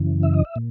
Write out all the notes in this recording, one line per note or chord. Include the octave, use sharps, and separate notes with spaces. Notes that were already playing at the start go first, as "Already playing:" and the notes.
Already playing: F#2 C#3 E3
E5
D#5
E5
A#2